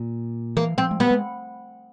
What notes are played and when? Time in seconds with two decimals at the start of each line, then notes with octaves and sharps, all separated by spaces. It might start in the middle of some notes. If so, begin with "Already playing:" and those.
Already playing: A#2
0.57 E3 A#3
0.78 F3 C4
0.91 G#3
1.00 G3 B3
1.11 G#3